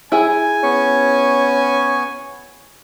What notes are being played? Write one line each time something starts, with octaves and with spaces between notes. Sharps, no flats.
E4 G#4 G#5
B3 C#4 C#6